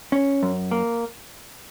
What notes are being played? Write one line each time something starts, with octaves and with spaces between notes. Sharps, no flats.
C#4
F#2
A#3